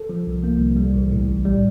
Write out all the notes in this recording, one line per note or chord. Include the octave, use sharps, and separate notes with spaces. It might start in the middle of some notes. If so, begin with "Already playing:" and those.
Already playing: A4
F3
C2
A#3
C2
G3
A1
A2
A1
G3